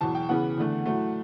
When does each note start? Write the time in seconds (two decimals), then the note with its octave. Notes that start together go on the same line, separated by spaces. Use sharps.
0.01 E2 B2 F#3 A5
0.15 G5
0.29 C#3 E3 B3 F#5
0.58 E2 D3 A3
0.86 A2 F#3 A3